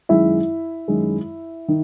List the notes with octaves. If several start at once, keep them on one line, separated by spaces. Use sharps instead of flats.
F#2 D#3 G#3 E4 E5
F#2 D#3 G#3
D#3